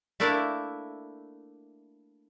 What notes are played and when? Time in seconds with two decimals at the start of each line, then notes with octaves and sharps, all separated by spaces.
0.20 A3 A#3 D4 E4 A#4 D5